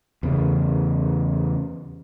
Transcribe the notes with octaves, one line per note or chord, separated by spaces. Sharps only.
E2 C#3